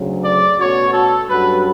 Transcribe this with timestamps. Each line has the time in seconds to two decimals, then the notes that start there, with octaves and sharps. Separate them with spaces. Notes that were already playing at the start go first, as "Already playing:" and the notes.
Already playing: D2 C#3 F#3
0.25 D5
0.59 B2 A3 C#4 F#4 C#5
0.94 A4
1.27 G2 F#3 C#4 F#4 A4 B4